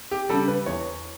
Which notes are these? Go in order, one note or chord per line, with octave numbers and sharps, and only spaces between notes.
G4
C#3 G3 A4
B4
E2 C#5